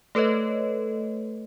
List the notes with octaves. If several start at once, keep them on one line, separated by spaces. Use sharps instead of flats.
A3 A4 B4 C#5 D#5